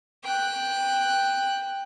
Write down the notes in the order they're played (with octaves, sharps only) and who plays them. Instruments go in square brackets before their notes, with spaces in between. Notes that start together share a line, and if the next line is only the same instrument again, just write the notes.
[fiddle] G5 F#6